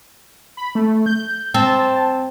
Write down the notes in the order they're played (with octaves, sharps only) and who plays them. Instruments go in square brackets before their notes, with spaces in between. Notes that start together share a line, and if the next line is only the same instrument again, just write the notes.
[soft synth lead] B5
A3
G6
[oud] C4 [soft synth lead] A5